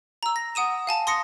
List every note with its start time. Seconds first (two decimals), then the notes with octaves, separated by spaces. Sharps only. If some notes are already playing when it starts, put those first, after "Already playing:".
0.23 A#5 E6
0.36 A#6
0.55 F#5 D#6 D#7 E7
0.87 F5 G#5 A5
1.07 C6 D#6 A#6 C#7